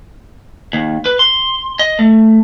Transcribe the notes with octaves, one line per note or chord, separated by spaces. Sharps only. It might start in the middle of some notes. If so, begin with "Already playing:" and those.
D#2
B4
C6
D#5
A3